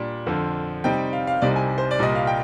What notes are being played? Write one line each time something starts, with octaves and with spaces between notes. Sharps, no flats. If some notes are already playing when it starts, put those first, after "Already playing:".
Already playing: A#2 G3 D4
F2 D3 F3
C3 G3 C4 D#4 G5
F5
F5
C2 C3 G3 C4 D#4 D5
G#5
C5
D5
C2 A#2 G3 D#5
F5
G5